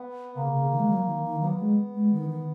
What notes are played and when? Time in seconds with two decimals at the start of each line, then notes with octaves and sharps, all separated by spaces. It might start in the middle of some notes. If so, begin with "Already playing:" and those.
Already playing: B3
0.35 C#3 A#3
0.54 C#3
0.72 D#3
0.80 G#3
0.89 F#3
1.06 D#3
1.24 D#3
1.41 F#3 B3
1.60 G#3
1.95 G#3
2.12 D#3
2.30 D#3